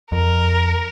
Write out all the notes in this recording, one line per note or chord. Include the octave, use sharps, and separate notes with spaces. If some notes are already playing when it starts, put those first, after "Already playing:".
F2 A#4